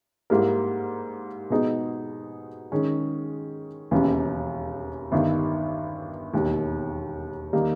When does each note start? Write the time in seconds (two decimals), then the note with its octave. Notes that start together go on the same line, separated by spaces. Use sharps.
0.30 G#2 G3 A#3 E4 A#4
1.50 B2 G#3 B3 D#4 G#4
2.72 D#3 G#3 C#4
3.91 E1 D#2 C#3 E3
5.12 G1 G2 D#3
6.34 E1 D#2 D#3
7.53 D#3 G3 A#3 D#4